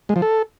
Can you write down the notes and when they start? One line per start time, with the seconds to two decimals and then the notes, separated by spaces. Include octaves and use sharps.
0.09 G#3
0.16 F3
0.22 A4